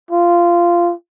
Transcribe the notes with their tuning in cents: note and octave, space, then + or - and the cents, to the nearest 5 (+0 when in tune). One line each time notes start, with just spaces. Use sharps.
F4 -15